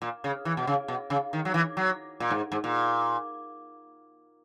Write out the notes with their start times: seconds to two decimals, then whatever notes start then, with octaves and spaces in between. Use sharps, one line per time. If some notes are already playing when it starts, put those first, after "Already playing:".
0.02 A#2
0.24 C#3
0.45 E3
0.57 B2
0.67 C#3
0.88 B2
1.10 C#3
1.33 D#3
1.45 F#3
1.54 E3
1.77 F#3
2.20 A#2
2.30 G#2
2.52 G#2
2.64 A#2